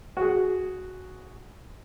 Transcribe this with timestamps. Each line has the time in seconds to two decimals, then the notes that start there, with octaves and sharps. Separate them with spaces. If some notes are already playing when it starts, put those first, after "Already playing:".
0.17 F#4 G#4